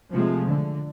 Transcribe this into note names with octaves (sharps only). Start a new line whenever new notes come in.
C3 F3 G#3 A3
D3